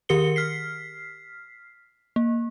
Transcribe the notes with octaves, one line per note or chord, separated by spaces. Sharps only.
D#3 G4 A#4 C#7 G7
F6 B6 C7
A#3